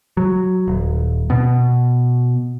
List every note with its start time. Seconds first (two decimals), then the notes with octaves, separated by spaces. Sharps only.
0.17 F#3
0.68 D#1
1.30 B2